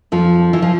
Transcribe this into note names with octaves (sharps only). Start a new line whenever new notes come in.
F2 F3
E3
F3